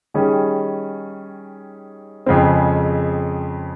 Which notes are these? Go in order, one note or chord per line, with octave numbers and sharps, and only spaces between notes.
D#3 G3 C#4 G#4
F2 C#3 G#3 C4